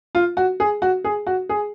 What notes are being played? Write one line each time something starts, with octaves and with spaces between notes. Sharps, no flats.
F4
F#4
G#4
F#4
G#4
F#4
G#4